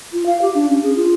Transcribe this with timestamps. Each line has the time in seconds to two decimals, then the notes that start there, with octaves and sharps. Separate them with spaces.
0.13 F4
0.26 F5
0.42 G4
0.55 D4
0.69 C#4
0.83 G#4
0.96 F4